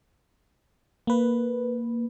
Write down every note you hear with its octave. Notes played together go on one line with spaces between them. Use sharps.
A#3 B4